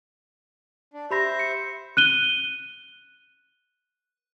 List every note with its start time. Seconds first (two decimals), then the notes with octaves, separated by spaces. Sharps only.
0.94 D4
1.11 G4 C5 E5 B5 A#6
1.39 C#7
1.97 F#6 D#7 G7